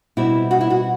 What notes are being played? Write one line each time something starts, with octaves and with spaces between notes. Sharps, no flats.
B2 G3 C4 E4
F#4
E4
F#4